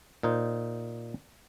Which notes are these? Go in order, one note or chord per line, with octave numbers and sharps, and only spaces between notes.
A#2 D#4 C5